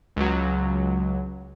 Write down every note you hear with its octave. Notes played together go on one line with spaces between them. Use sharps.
C#2 F#3